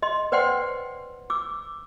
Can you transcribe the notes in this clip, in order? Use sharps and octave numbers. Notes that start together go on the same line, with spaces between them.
D#5 C6
B4 C5 D5 F#5 G5 C6
D6 E6